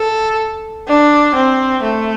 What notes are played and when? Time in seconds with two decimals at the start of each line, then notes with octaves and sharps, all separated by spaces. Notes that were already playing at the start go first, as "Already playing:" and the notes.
Already playing: A4
0.88 D4
1.35 C4
1.83 A3